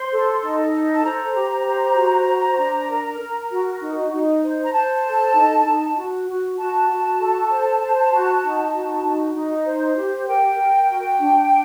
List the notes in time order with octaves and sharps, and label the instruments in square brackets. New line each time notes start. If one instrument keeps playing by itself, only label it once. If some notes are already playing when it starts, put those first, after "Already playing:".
Already playing: [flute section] C5 C6
A4
D#4
A4
A5
C5 A#5
G4
C5
F#4
C5
D4
A#4
A#4
F#4
D#4
D#4
C5
A#5
C5 A5
A4
D#4
D#4
F#4
F#4
F#4 A5
F#4
A4
C5
C5
F#4
D#4
F#4
D#4
D#4
C5
G4
A#4 G5
A#4
F#4
D4